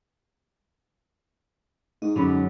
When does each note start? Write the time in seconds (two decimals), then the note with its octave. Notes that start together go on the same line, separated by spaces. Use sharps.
2.02 G#2 D#4
2.16 F#2 D3 G#3 C#4 B5